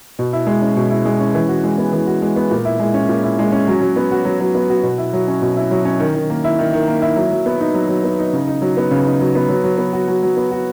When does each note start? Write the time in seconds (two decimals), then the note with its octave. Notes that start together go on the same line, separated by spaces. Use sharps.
0.19 B2
0.33 E4
0.47 G#3
0.62 C#4
0.76 B2
0.91 E4
1.05 G#3
1.20 C#4
1.35 E3
1.49 F#4
1.63 G#3
1.78 B3
1.93 E3
2.07 F#4
2.22 G#3
2.36 B3
2.51 A#2
2.65 E4
2.80 G#3
2.94 C#4
3.09 A#2
3.23 E4
3.39 G#3
3.52 C#4
3.68 F#3
3.81 F#3
3.96 B3
4.12 F#4
4.25 F#3
4.40 F#3
4.55 B3
4.70 F#4
4.83 B2
4.98 E4
5.13 F#3
5.28 C#4
5.42 B2
5.57 E4
5.71 F#3
5.85 C#4
6.00 D#3
6.15 D#3
6.30 A#3
6.44 E4
6.59 D#3
6.73 D#3
6.87 A#3
7.02 E4
7.16 F#3
7.31 F#3
7.46 B3
7.60 D#4
7.74 F#3
7.89 F#3
8.04 B3
8.19 D#4
8.33 C#3
8.47 D#4
8.62 F#3
8.77 B3
8.91 C#3
9.06 D#4
9.21 F#3
9.35 B3
9.49 F#3
9.64 F#3
9.78 B3
9.93 F#4
10.08 F#3
10.23 F#3
10.37 B3
10.51 F#4